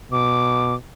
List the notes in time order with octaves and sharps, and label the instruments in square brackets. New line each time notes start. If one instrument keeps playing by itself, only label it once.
[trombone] B2 [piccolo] D6